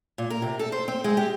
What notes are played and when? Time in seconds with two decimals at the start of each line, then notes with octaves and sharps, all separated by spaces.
0.18 A#2
0.30 A#4
0.42 C3
0.59 A4
0.72 C5
0.88 C4
1.04 G#3
1.17 G4